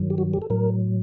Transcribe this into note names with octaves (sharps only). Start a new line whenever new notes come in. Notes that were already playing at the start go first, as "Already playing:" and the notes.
Already playing: G2 D#3 F#3
G4
F#4
G4
A4
A2 F#3 A#4